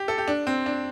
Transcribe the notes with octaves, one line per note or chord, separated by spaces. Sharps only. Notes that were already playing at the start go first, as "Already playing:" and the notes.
Already playing: G4
A4
G4
D4
C4
D4